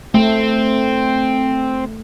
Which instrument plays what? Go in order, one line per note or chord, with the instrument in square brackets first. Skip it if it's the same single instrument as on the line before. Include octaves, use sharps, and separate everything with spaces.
[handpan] A3 [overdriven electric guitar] C4